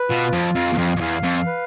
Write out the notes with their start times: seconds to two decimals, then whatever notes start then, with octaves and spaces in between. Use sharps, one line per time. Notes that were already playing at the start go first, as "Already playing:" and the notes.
Already playing: B4
0.09 B2 F4
0.33 F2
0.55 F2 F5
0.73 E2
0.78 F2
0.96 F2
1.00 E2 F5
1.24 F2
1.46 B4